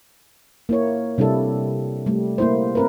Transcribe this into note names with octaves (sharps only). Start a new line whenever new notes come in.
A#3 E4 C#5
C3 G3 D4 E4 A4
G3 A3
A#3 E4 C5
C4 A#4 B4